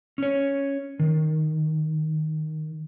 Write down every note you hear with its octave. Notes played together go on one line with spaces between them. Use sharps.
C#4 C#5
D#3